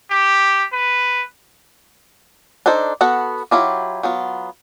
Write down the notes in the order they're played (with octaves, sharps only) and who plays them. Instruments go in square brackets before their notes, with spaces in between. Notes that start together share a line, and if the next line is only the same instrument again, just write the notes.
[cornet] G4
B4
[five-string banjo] D4 D#4 A4 C5
B3 F#4 A4 F#5
F#3 E4 F4 G4
F#3 B3 F4